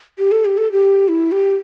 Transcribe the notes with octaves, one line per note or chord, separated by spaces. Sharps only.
G4
A4
G4
A4
G4
E4
G4